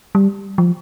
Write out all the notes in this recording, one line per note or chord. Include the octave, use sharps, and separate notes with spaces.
G3
F3